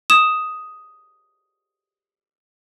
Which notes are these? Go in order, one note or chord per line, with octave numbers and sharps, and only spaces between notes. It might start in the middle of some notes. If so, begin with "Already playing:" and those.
D#6 E7